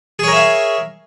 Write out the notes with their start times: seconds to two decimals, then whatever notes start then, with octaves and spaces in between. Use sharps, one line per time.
0.19 G#4
0.23 C#5
0.28 A#4
0.32 E5
0.36 F5